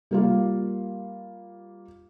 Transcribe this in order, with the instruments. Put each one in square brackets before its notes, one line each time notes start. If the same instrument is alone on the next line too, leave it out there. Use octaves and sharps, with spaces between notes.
[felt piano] G3 A#3 F4